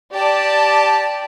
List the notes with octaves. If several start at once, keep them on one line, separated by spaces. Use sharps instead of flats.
G4 D5 A5